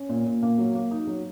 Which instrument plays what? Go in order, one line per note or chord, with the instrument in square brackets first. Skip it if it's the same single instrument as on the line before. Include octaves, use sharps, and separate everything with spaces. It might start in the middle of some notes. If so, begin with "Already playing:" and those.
Already playing: [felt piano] C#4
A#2
A#2
A#3
F#3
A#3
D#4
F#3